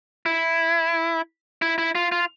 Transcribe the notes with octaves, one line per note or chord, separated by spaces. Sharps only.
E4
E4
E4
F4
F4